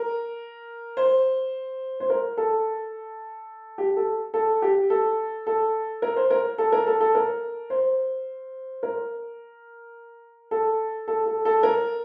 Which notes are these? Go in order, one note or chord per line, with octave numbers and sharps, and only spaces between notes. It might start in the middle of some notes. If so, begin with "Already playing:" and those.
Already playing: A#4
C5
C5
A#4
A4
G4
A4
A4
G4
A4
A4
A#4
C5
A#4
A4
A#4
A4
A4
A#4
C5
A#4
A4
A4
A4
A4
A#4